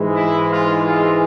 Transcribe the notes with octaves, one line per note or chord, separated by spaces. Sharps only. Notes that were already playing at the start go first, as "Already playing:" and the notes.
Already playing: G#2 E3 G#3
E4
F4
F4